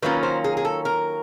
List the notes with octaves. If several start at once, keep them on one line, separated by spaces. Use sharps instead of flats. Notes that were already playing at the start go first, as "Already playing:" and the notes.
D#3 F#3 A#3 C#4 F4 B4
C5
G#4
G#4
A4
A#4